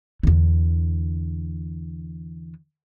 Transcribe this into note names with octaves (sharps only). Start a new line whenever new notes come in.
E2 D3